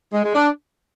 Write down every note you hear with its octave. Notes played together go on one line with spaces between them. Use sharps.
G#3
G#3
D4